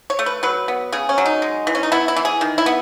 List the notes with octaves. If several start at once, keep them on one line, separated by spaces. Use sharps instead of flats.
C#5
A3
B4
F#3 B4
B3
C#3 G#4
C#4
F#3
D#4
G#3
E3
C#4
D#4
B3 E4
E4
E3
G#4
D#3
E4
B3